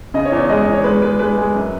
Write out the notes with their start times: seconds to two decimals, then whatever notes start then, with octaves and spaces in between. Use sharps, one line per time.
0.14 C#3 D#5
0.25 C#5
0.32 E2
0.37 C#5
0.49 G#3 D#5
0.62 C#5
0.66 E2
0.73 C#5
0.84 G#3 B4
1.02 G#3 B4
1.19 G#3 B4
1.38 G#3
1.55 F#2